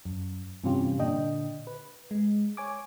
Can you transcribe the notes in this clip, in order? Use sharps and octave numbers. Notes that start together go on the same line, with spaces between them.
F#2
G2 C3 E3 C#4 F4 G4
A#2 D3 D4 D#5 G5
B4
G#3
C#5 G#5 D6